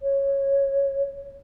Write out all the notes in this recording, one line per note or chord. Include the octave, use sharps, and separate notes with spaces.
C#5